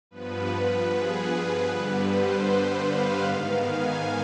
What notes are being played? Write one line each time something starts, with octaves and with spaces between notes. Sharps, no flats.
G2 F3 B3 B4
G#4
B4
G2 D3 G3 B3
C5
C5
F5
G#2 D#3 B3
G#5